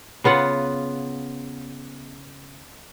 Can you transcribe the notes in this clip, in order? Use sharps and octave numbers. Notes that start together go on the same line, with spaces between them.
C#3 B3 F4 F#5